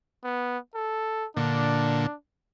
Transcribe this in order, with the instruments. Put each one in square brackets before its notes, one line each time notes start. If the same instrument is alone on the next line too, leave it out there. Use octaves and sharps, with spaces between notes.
[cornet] B3
A4
[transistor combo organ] A#2 D3 [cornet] D4